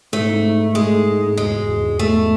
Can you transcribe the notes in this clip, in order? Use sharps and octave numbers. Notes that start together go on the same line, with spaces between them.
G#2 A3
G#2
D#4
D#4
G#3 A3
D#4
D#4
G#2
E1 G#3
E1
E1
E1
E2 A3